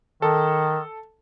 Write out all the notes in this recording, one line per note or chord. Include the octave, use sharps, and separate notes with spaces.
D#3 A4